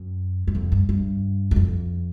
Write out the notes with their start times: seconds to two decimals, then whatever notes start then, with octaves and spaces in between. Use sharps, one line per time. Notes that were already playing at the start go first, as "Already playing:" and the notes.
Already playing: F#2
0.47 F#2
0.55 F2
0.72 G2
0.89 G2
1.51 F#2
1.56 F2